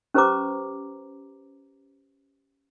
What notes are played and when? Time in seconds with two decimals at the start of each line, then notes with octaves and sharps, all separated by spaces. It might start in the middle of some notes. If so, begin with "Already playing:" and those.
0.14 C#4 G4 B4 C5 A#5 D6